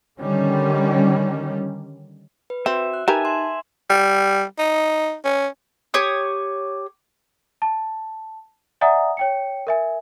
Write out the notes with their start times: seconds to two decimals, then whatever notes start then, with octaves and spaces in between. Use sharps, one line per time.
0.19 D3 D#3 G3 C#4
2.50 B4
2.66 C4 F#4 E5
2.93 F#6
3.08 D#4 G4 A#4 B4 E5 G#5 A5
3.25 C6
3.90 G3
4.59 D#4
5.25 C#4
5.94 G4 C#5 D#6
7.62 A5
8.81 D5 E5 F#5 G#5 A#5 D#6
9.17 C#5 G5 C#7
9.67 A#4 E5 G#5